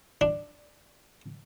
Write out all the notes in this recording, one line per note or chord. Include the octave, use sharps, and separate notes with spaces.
D4